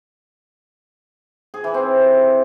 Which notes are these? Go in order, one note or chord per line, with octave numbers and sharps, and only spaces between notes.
G#4
E3
C4